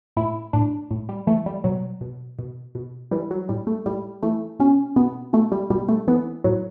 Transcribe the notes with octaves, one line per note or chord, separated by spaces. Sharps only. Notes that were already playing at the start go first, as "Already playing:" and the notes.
A2 E4
A2 D4
A2
G3
E3 A3
G3
B2 F#3
B2
B2
B2
E3 G3
F#3
A2 G3
A3
A2 G3
E3 A3
B2 C#4
B2 B3
B2 A3
G3
B2 G3
A3
E3 B3
A2 F#3